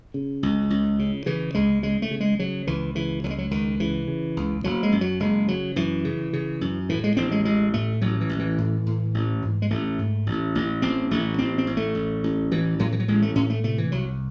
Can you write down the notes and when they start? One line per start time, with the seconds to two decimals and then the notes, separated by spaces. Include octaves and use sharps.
0.14 C#3
0.43 C#2
0.70 C#2
0.99 C#3
1.26 C#3 E3
1.54 C#2 G#3
1.83 C#3 G#3
2.02 A3
2.11 C#3
2.20 G#3
2.39 C#3 F#3
2.67 C#2 E3
2.95 C#3 E3
3.24 C#2 F#3
3.30 G#3
3.38 F#3
3.51 C#2 D#3
3.80 C#3 E3
4.07 C#3
4.37 C#2
4.64 F#1 F#3
4.83 G#3
4.92 F#2
5.01 F#3
5.20 F#1 G#3
5.48 C#3 F#3
5.76 F#2 E3
6.05 C#3
6.33 C#3
6.61 F#2
6.89 A2 E3
7.04 G#3
7.17 A1 C4
7.31 G#3
7.45 A1 G#3
7.74 A2 A3
8.01 A1 F#3
8.21 E3
8.29 A1
8.39 E3
8.58 A2
8.86 A2
9.14 A1
9.42 G#2
9.62 G#3
9.70 A1 A3
9.99 G#2
10.26 A1
10.55 A1
10.82 A1 C4
11.11 A1 A3
11.38 A1 C4
11.58 C4
11.67 A1
11.77 A3
11.95 A1
12.24 A1
12.52 A1 E3
12.79 A2 F#3
12.92 E3
13.00 F#3
13.08 A1 G#3
13.22 A3
13.35 A2 C#4
13.50 A3
13.64 C3 A3
13.78 E3
13.92 C2 F#3